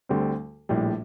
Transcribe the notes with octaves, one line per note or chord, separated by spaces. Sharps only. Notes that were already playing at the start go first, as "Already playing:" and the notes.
D2 D3 G3 C4
A#1 A2 G3